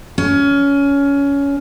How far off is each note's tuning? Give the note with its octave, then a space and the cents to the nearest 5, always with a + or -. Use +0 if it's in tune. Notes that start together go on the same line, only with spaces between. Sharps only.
C#4 +20